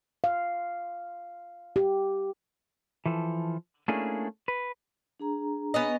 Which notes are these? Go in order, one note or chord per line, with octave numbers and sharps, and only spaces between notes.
F5
G4
E3 F3 A4
A3 A#3 C#4 D4 E4 G#4
B4
D4 G#4 A#5
B3 C#4 D#5